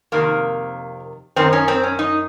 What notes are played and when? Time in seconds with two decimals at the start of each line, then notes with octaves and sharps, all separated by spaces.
0.12 F2 C3 D#3 A#3
1.36 F#2 D#3 C4
1.53 C#4
1.68 C4
1.83 C#4
1.99 D#4